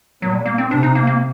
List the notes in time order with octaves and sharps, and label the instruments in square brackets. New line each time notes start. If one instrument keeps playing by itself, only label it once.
[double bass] A#2 [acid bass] F#3
[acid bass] G3
A#3
C4
[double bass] C3 [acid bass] D4
[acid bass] D#4
A#3
A#3